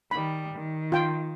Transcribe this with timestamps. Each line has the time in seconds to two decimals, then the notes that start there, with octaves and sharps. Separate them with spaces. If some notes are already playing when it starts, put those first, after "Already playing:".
0.11 D#3 G3 B5
0.55 D#3
0.92 F4 G5